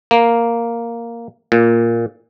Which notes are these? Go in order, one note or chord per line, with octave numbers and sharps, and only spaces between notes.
A#3
A#2